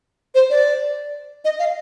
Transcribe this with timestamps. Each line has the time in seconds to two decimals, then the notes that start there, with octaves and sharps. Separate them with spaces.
0.35 C5
0.50 D5
1.45 D#5
1.59 F5